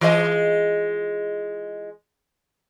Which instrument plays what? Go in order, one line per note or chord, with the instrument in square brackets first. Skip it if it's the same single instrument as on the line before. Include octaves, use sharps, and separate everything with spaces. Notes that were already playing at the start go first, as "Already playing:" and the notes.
[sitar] E3 G#3 D#5